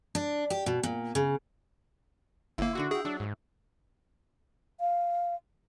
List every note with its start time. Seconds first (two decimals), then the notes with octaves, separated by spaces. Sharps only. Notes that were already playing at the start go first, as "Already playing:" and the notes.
0.15 D4
0.50 G4
0.66 B2
0.83 A#2
1.15 C#3
2.58 G1 A#3 E4
2.75 A#2 D3 D4 F#4
2.91 E4 G4 G#4
3.05 F#3 D4
3.20 G#2
4.80 F5